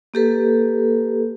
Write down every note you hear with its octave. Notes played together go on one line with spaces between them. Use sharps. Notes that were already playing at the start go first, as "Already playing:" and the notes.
A#3 G4 A4 B4